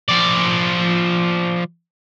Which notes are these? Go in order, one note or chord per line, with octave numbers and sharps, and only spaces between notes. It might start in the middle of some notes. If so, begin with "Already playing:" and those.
F3 D5